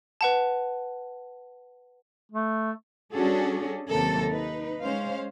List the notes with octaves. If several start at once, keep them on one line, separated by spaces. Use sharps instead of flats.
B4 F#5 A5
A3
G3 C#4 D4 F#4 G#4 A4
D#2 C3 F#3 A4 A#4
D#4 B4
G#3 C#4 C5 F5